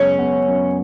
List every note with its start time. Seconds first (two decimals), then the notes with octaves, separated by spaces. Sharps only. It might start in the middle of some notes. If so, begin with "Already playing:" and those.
Already playing: F#2 C#3 G#3 B3 C#4
0.19 B3
0.48 F#2